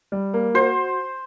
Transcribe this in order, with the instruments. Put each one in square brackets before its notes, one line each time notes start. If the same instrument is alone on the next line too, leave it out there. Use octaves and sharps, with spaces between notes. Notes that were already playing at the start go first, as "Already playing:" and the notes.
[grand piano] G3
A#3
[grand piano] F#4 [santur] C5